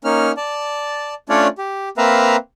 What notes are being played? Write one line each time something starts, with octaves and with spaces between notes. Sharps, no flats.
A#3 C#4 D#4 F6
D5 A5
A3 C#4 D4 F4 C#5 D5
G4
A#3 C4 B4 E5 F5 A#5